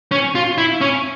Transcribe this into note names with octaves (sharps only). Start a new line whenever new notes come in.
C#4
F4
E4
C#4